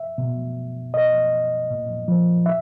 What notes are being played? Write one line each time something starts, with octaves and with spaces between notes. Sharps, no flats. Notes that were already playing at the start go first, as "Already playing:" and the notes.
Already playing: E5
B2
B2 D#5
A#2
F3
E5